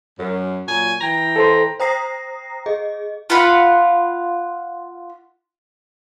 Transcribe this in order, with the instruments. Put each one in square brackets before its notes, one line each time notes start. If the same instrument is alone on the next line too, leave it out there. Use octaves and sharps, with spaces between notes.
[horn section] F#2
A#2 F#3 G#5
E3 G5 A#5
[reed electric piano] A4 C5 C6
[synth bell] C5 G5 A#5 D#6 A#6 C7
G#4 D#5
[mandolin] F4 F5 F#5 B5